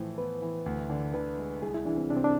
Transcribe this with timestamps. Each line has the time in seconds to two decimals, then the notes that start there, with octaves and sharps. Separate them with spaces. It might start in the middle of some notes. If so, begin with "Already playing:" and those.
Already playing: A2 E3 F3 C5
0.18 B3 B4
0.42 E3
0.66 D2
0.90 D3
1.14 D3 B4
1.38 G#3
1.62 C2 G#4
1.74 E4
1.85 E3 D4
1.98 C4
2.10 C3 D4
2.17 C4
2.24 D4